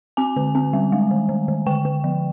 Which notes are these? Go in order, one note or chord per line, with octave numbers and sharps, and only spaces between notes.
C4 G#5
D3
C4
G3
G#3
D#3
D#3
D#3
D3 G5
D3
F3